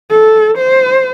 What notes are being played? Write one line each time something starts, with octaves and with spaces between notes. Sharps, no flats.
A4
C5